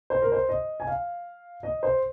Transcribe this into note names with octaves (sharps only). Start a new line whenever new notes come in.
C5
A#4
C5
D#5
G#5
F5
D#5
C5